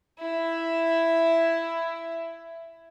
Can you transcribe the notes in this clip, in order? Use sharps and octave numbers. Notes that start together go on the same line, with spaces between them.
E4 E5